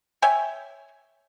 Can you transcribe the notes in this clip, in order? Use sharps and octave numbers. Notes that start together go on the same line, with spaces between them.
C#5 E5 G5 G#5